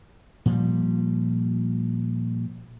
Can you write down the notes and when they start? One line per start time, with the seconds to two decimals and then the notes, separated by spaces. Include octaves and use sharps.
0.46 A#2 F3 G3